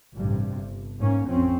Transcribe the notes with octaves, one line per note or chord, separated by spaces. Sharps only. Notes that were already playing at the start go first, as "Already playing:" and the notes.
A1 G2 C3 G3
G1
G#2 A#3 C#4
A1 F2 C4 C#4